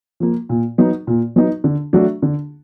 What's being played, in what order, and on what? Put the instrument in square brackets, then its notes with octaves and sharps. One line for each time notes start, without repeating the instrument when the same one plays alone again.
[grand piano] F3 A#3
A#2
F#3 B3 D#4
A#2
F#3 B3 D#4
D3
F#3 A3 D4 F#4
D3